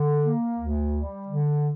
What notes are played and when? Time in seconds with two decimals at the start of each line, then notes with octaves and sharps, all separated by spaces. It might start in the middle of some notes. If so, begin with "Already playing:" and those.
Already playing: D3
0.24 A#3
0.58 D2
0.93 G3
1.28 D3